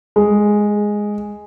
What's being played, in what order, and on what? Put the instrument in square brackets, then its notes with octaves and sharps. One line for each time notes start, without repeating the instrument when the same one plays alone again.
[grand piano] G#3